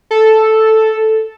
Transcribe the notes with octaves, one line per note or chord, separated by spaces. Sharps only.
A4